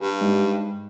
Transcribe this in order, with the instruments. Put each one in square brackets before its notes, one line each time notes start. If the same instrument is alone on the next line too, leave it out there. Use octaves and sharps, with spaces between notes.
[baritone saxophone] G2 [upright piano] G3
[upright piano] G#2